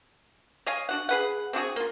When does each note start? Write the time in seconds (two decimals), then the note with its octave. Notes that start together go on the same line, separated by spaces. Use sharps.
0.66 C#5 D#5 F5 G#5
0.89 D4 F#4 F#5
1.09 G#4 B4 F#5
1.53 C4 D4 F#4 G#4
1.76 A#3 F4